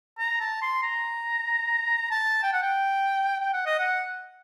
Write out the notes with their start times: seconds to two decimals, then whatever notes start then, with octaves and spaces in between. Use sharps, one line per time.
0.19 A#5
0.40 A5
0.62 C6
0.83 A#5
2.11 A5
2.43 G5
2.53 F#5
2.62 G5
3.40 G5
3.53 F#5
3.66 D#5
3.79 F#5